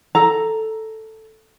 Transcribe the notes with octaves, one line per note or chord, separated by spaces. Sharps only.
A4 A#5